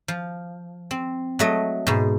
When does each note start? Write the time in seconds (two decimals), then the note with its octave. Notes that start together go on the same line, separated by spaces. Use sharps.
0.08 F3
0.91 C4
1.39 F#3 A3 D#5
1.87 G#2 B2